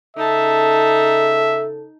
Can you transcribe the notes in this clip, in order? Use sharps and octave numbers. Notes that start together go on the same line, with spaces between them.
C#3 D#4 A4 E5 A5